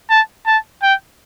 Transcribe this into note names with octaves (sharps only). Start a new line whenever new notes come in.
A5
A5
G5